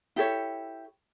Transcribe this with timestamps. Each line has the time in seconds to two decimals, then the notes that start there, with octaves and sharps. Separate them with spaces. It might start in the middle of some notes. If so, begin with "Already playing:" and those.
0.16 E4 G4 A4 C#5